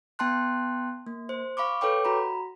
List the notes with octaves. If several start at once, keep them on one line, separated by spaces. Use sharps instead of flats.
B3 G5 A5 C6 F#6
A#3
C5
F5 B5 C#6 D6
A4 B4 C#5 G5 D6
F#4 A#5 B5